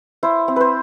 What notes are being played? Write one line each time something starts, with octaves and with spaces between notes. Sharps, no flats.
E4 C5
C4
B4 C5